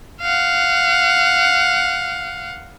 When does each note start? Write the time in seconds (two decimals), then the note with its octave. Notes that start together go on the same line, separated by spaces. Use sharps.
0.22 F5 F#5